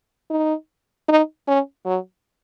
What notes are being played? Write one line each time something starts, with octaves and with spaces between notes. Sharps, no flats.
D#4
D#4
C#4
F#3